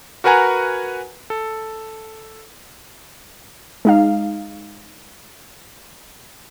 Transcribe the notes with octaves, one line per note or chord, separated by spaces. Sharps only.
F#4 A#4 B4 F#5 G#5 A#5
A4
G#3 D#4 F5